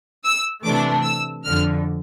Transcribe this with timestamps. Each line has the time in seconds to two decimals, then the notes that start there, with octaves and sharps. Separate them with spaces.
0.25 E6
0.64 C3 E3 A3 D4 D6
1.05 E6
1.46 F2 D3 F3 F6